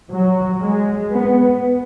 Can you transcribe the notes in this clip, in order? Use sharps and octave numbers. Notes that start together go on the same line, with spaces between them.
F#3
G#3
B3